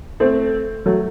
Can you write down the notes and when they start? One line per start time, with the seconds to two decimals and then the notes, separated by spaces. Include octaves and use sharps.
0.20 A3 C4
0.86 F#3 A3